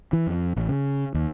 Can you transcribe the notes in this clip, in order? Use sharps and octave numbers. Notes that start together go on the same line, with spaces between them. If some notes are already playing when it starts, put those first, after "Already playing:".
E3
F2
A1
C#3
D#2